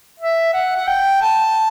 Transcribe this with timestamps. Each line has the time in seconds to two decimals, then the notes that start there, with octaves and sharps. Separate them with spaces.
0.20 E5
0.54 F#5
0.76 F#5
0.87 G5
1.22 A5